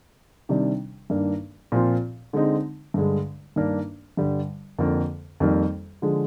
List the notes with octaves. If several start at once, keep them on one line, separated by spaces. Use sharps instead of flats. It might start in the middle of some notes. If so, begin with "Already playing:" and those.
C3 D#3 G3 D4
G2 D#3 A#3 D4
A#2 F3 C4 F4
D3 G#3 C4 D#4
G2 D3 G#3
G2 D#3 A#3 D4
G2 D3 G3
F2 D3 F3 A#3
F2 D#3 G3 A#3
D3 F3 G#3